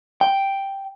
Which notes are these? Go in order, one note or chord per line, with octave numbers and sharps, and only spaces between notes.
G5